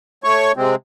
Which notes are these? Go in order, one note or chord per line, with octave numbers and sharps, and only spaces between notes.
A3 C#5 C#6
C3 G#3 C4